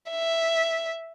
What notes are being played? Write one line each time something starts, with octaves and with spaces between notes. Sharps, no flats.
E5